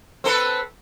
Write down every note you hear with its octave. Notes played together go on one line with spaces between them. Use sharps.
C4 A4 B4